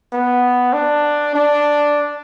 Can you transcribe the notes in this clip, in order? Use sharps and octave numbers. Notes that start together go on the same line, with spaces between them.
B3
D4
D4